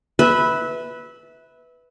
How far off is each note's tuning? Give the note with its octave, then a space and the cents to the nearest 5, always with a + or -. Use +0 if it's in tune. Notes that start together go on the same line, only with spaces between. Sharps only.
B4 +0 E5 -20